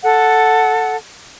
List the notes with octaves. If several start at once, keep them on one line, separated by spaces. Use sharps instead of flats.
A4 F#5